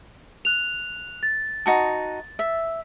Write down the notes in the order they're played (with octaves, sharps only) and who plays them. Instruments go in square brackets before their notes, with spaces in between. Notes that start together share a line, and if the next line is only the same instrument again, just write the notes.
[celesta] F#6 F7
A6
[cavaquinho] D#4 F#4 A5
E5